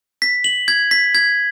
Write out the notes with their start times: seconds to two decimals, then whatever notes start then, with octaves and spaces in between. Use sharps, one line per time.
0.22 B6
0.44 F#7
0.68 G#6
0.91 B6
1.15 G#6